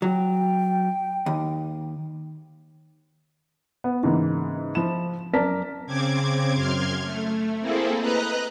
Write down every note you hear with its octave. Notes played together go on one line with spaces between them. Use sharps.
F#3 G5
D#2
B3
G#2 C#3 E3 A#3
F3 E4 E7
F#2 A#4 D5 A5 B6
C#3 C4 D6 G#6
F#2 C6 F6 G#6
A3
A#3 C4 E4 G#4 A4
B4 D#5 A#5 F#6